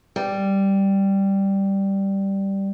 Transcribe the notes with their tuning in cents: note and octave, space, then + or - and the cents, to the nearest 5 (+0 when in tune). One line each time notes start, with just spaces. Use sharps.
G3 +0